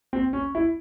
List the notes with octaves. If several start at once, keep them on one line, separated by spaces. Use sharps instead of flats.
C4
C#4
E4